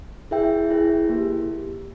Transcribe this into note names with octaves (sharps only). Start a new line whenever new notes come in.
E4 G#4 B4 E5 G5
E4 G#4 B4 E5 G5
A#3 E4 G4